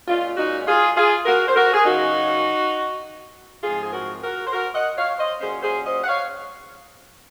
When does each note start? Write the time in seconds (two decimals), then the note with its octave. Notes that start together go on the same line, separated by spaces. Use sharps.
0.08 A#2 G#3 C#4 F4
0.37 D#4 F#4
0.67 F4 G#4
0.96 F4 G#4
1.26 F#4 A#4
1.48 C5
1.56 F#4 A#4
1.73 G#4
1.85 F#2 C#3 F#3 D#4 F#4
3.63 G#2 F3 C4 F4 G#4
3.83 G#4
3.92 F#4 A#4
4.22 F#4 A#4
4.46 C5
4.52 F#4 A#4
4.74 D#5 F#5
4.96 C#5 F5
5.19 C5 D#5
5.40 A#2 F#3 C#4 G#4 C5
5.63 G#4 C5
5.86 C5 D#5
6.03 F#5
6.07 C#5 F5